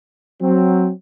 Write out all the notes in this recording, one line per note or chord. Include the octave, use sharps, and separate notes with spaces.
F#3 C4